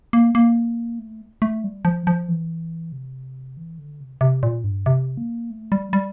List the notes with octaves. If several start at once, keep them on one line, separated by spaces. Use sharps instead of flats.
A#3
A#3
A3
A3
G3
F3
F3
E3
C3
E3
D3
C3
C3
A#2
G2
C3
A#3
A3
G3
G3